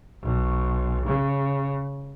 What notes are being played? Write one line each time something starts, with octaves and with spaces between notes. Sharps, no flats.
B1
C#3